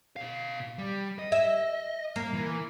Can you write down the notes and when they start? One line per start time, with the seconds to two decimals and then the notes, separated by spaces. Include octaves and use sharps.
0.16 B2 F5
0.78 G3
1.19 D#5
1.32 E5
2.16 A#3
2.34 E3